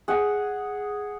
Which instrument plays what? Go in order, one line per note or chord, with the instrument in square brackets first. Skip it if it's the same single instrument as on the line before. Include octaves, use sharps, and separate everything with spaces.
[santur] G#4 F#5